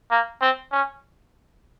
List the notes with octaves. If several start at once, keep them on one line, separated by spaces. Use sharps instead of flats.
A#3
C4
C#4